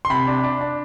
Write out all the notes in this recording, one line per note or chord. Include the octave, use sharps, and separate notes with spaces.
C6
C3 B5
D4
D4
D4